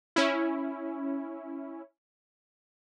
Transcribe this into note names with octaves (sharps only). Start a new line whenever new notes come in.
C#4 E4